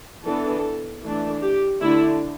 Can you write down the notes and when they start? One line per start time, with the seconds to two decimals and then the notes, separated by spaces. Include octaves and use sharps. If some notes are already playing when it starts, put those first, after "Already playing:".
0.24 E3 B3 D4 A4
1.02 E3 A3 D4
1.42 G4
1.81 D3 A3 D4 E4